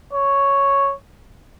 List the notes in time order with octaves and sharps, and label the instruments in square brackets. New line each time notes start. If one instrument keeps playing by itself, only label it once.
[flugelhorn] C#5